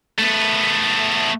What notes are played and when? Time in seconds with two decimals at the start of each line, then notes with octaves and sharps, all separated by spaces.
0.18 A3 B3